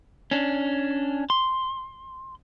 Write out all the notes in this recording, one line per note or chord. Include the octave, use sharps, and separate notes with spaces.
C#4 D4
C6